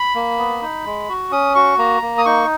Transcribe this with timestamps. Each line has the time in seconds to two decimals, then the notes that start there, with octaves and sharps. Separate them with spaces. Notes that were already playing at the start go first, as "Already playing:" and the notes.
Already playing: B5
0.15 A#3
0.38 B3
0.62 D#4
0.85 G#3
1.09 F#4
1.31 C#4 D#6
1.55 F#4 C#6
1.78 A#3 A#5
2.02 A#3
2.18 D#6
2.25 D#4 C#6